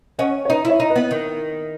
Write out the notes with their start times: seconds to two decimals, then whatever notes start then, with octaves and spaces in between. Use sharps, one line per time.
0.19 C#4 D#5 F#5
0.45 C#5
0.49 D#4 B4 D#5
0.65 E4 C#5 E5
0.80 D#4
0.90 B4 D#5
0.96 B3
1.11 D#3